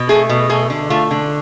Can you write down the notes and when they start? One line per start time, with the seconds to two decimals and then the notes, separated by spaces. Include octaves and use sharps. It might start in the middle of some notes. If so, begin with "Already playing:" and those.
Already playing: B2
0.09 A3 G#4
0.29 B2
0.49 A3 G#4
0.70 D3
0.90 A3 F4
1.11 D3